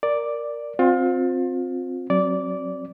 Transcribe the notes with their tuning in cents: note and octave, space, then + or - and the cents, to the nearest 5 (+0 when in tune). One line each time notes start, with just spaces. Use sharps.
A#4 +0 D5 +0
C4 +0 F4 +30
F#3 +0 C4 +25 D5 -15